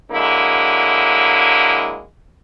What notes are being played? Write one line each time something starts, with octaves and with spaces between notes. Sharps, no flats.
D3 F#3 G#3 A#3 E4